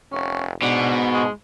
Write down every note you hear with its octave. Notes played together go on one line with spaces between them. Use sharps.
F1 C#4
G#2 B2 D4
G#3